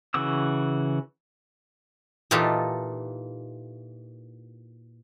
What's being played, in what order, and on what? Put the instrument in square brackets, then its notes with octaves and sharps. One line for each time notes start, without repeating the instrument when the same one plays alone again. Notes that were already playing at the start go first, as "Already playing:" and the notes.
[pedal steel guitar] C#3 E3 F#4 D6 E6
[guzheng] A#2 E3 D#4 F4 G4 A4